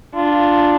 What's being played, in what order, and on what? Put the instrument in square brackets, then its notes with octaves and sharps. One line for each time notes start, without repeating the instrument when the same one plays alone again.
[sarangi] D4 [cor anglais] F4